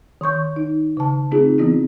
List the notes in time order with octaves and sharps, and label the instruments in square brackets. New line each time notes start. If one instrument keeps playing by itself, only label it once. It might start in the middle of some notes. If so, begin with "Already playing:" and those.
[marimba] D#3 C6 C#6 G6
D#4
C#3 A5
A3 C4 D#4 F4 G#4
E3 B3 C4 E4 F4